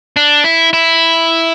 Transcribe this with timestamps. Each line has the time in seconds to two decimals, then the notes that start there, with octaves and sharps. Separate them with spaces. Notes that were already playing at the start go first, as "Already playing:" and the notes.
0.17 D4
0.44 E4
0.73 E4